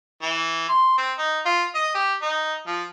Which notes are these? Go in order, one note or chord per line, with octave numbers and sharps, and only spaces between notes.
E3
C6
C4
D#4
F4
D#5
G4
D#4
F3